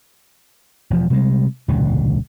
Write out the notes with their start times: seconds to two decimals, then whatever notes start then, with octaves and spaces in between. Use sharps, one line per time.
0.90 E1 F3
1.10 C3 G3 G#3
1.68 E1 C#2 A#2 D3